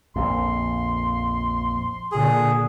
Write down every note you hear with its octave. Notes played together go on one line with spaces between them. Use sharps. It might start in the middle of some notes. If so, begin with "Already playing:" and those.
A#1 F2 C6
A#2 D3 G#4